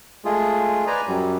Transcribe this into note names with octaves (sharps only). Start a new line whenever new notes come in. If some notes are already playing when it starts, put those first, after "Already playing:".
G#3 A3 F4 G#4
B4 C5 D5 G#5 A#5
F#2 F#3 G3